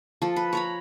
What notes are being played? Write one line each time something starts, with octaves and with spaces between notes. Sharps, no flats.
F3 A4
B4
C#5 A#5 B5